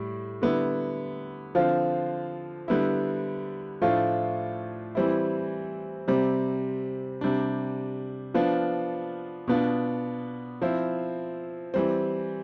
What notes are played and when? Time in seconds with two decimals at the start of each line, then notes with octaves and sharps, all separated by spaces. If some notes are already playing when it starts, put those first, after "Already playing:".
Already playing: A2 G3
0.42 D3 G3 B3 E4
1.55 D3 F3 C4 F4
2.68 D3 G3 B3 E4
3.82 A2 F3 A3 D4 F4
4.95 E3 G3 C4 E4
6.08 C3 G3 C4
7.21 C3 G3 D4
8.34 F3 B3 D4 F4
9.48 B2 B3 D4 F4
10.62 F3 C4 E4
11.74 E3 G3 C4